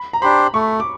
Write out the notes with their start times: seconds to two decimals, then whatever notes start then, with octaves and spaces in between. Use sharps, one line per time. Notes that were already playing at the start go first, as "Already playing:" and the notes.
Already playing: B5
0.13 A#5
0.22 D4 G4 C5 B5
0.54 A3 C#6
0.80 D6